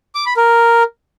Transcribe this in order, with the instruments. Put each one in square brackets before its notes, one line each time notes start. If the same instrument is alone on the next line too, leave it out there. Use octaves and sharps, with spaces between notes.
[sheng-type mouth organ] D6
B5
A#4